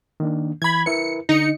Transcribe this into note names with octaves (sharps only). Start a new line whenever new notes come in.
D#3 A#3 D4
E3 B5 G#6
E4 A#4 B4 C#7
D3 D#4 C#7